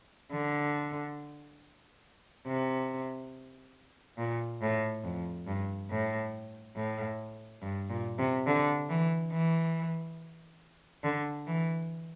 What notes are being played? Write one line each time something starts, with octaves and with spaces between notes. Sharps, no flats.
D3
C3
A#2
A2
F2
G2
A2
A2
G2
A#2
C3
D3
E3
E3
D3
E3